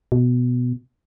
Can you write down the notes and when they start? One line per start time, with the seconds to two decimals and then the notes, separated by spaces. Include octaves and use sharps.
0.12 B2